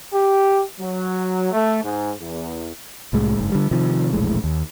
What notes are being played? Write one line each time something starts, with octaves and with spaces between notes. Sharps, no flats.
G4
F#3
A3
G#2
E2
C2 A2 G#3
F#1 G#2
D3 G3
C3 D#3 F3
E1 A#1 A2 G#3
D#2